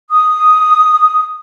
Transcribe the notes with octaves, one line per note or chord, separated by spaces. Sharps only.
D#6